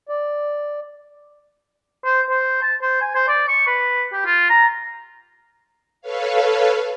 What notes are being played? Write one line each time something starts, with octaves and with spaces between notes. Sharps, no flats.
D5
C5
C5
A5
C5
G#5
C5
D5
C#6
B4
G4
F4
A#5
A4 B4 C#5 F5